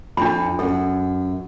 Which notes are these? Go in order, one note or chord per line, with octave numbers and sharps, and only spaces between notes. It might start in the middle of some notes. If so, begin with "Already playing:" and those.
F2 D4 B5
F#2 A4